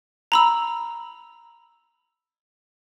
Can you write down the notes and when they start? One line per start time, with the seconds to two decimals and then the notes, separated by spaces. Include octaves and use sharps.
0.32 A#5 B5 E6